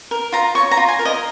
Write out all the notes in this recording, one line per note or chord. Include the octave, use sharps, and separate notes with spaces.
A#4
F4 A#5
C#5 C#6
A#5
F4
G#5
A#4
D#5